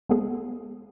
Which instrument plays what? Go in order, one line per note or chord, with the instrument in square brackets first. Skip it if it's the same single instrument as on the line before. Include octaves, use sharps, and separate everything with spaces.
[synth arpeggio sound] G#3 B3 G#4 A4